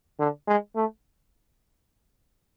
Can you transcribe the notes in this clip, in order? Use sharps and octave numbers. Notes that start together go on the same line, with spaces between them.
D3
G#3
A3